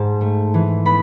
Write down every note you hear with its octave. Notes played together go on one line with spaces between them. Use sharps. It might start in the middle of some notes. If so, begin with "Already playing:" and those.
Already playing: G#2 A5
A3
E3
B3 B5